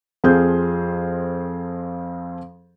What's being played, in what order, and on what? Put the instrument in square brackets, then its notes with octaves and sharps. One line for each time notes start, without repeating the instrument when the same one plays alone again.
[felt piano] F2 F3 C4 G#4 F5 G6